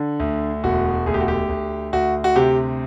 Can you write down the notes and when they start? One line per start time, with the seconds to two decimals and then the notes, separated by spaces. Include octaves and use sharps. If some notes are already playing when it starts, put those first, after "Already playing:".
Already playing: D3
0.20 D2
0.64 E1 F#4
1.06 D2 G#4
1.14 G4
1.21 F#4
1.28 G4
1.49 D2
1.93 D2 F#4
2.24 F#4
2.36 C3 G4